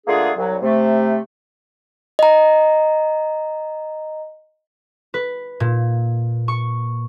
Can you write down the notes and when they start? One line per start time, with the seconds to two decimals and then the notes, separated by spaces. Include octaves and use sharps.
0.07 D3 A3 A#3 D4 F4 G#4
0.37 C2 F#3
0.62 C3 A3
2.19 D#5 A#5
5.14 B4
5.60 A#2
6.48 C#6